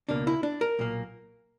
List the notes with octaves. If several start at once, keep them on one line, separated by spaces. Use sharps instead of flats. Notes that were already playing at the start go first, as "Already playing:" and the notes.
C#2 B2 A#3 D4
E4
D4
A#4
B1 A#2 A#3